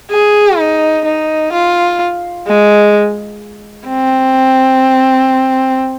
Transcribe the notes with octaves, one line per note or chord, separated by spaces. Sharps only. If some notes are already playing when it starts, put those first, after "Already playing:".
G#4
D#4
D#4
F4
G#3
C4